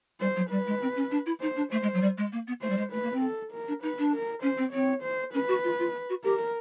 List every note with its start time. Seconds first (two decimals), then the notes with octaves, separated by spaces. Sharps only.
0.20 G3 C5
0.36 F#3
0.50 G3 B4
0.67 G#3
0.82 C4
0.96 C#4
1.11 D4
1.26 E4
1.41 D#4 C5
1.56 D4
1.72 A3 C5
1.82 G#3
1.94 F#3
2.01 G3
2.17 G#3
2.32 A#3
2.47 B3
2.62 A3 C5
2.70 G3
2.77 G#3
2.92 A3 B4
3.03 A#3
3.13 C4
3.22 A4
3.52 A#4
3.68 D4
3.82 D#4 B4
3.98 D4
4.13 A#4
4.42 C#4 C5
4.57 C4
4.73 C4 C#5
5.03 C5
5.34 C#4 B4
5.48 F#4
5.63 F4
5.79 F4
6.09 F#4
6.24 G4 A#4